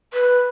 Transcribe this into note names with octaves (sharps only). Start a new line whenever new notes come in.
B4